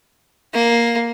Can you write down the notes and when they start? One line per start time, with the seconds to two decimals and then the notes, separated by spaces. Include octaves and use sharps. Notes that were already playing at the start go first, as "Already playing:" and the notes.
0.54 A#3